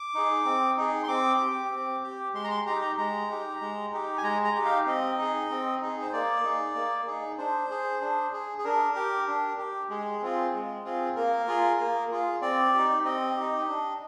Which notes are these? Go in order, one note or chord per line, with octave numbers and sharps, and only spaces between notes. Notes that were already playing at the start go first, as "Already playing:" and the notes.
Already playing: D6
D#4 G#4
C4
D#4 G#4
C6
C4 D6
G4
C4
G4
G#3 C6
A#5
C6
D#4 G4 A#5
A#5
G#3 A#5
D#4 G4
G#3
D#4 G4
G#5
G#3 A#5
A#5
D#4 G4
F5
C4 D#5
D#4 G#4
C4
D#4 G#4
C5
A#3 D5
D#4 G#4
A#3
D#4 G#4
D4 C5
G#4
D4
G#4
G#4
D4 A#4
G4
D4
G4
G#3 G#4
C4 F4 G#4
G#3
C4 F4 G#4
A#3 A#4
F4 G#4
A#3
F4 G#4
C4 D5
D#4 G4
C4 D#5
D#4 G4
D4